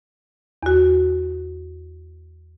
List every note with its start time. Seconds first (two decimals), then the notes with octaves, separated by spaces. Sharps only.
0.63 E2 F#4